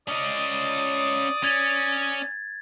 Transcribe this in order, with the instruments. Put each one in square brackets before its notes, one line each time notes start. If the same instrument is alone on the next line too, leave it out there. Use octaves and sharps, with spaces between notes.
[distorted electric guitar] C#4 D#5 [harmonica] D5 D#6
[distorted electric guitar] C#4 [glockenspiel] G#6 A6